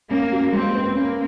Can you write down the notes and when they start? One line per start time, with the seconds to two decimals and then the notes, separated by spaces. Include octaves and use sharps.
0.10 A#3 C#4
0.32 F#4
0.53 G#3 C4
0.75 B4
0.95 A#3 C#4